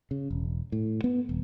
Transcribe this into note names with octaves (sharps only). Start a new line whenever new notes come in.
C#3
E1
A2
B3
D#1